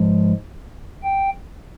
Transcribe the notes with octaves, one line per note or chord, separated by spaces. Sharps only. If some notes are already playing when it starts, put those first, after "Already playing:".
Already playing: G#2 F3 G#3
G5